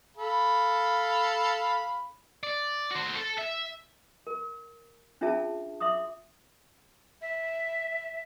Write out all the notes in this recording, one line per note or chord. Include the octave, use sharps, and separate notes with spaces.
A4 F5 B5
D5
F#4 C5
A4
E5
A#4
C#4 D4 F4 G#4 E5 A5
E5 C6 D6 D#6
E5